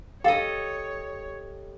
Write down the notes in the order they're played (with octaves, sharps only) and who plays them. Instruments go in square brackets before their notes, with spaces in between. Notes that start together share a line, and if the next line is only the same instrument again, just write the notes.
[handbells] G4 [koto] A4 D#5 [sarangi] C#5 [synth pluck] F5